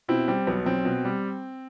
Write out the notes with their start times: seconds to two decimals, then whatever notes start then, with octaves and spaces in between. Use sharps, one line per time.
0.08 B2 C4 E4
0.28 G3 C4
0.47 B1 B3
0.66 B1 C4
0.85 B2
1.05 G3